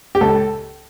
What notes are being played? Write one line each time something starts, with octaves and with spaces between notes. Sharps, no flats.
G4
C#2 A4